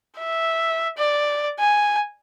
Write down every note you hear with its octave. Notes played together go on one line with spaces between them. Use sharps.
E5
D5
G#5